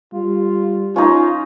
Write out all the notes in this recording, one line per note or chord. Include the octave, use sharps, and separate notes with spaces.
G3 F4
C#4 D#4 F4